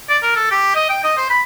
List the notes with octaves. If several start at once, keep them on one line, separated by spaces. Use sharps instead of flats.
D5
A#4
A4
G4
D#5
G5
D#5
C5
B5